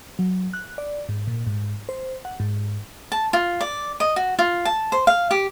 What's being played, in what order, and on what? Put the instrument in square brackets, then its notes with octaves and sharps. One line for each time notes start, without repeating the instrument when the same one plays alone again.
[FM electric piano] F#3
F#6
D5
G#2
A#2
G#2
C5
F#5
G#2
[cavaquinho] A5
F4
D5
D#5
F#4
F4
A5
C5
F5
G4